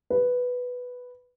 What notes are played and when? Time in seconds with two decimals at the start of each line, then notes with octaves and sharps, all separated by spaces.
0.10 B4